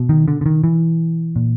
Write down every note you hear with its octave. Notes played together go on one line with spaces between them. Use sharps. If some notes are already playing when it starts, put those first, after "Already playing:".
Already playing: B2
D#3
D3
D3
D#3
E3
A#2